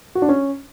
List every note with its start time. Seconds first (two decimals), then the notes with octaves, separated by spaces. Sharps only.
0.15 F#4
0.22 D4
0.29 C#4